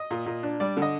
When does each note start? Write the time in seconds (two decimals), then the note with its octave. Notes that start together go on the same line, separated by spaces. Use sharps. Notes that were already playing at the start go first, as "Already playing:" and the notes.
Already playing: D#5
0.11 A#2
0.26 A#2
0.43 D4
0.60 G3 D5
0.77 D3
0.82 D#5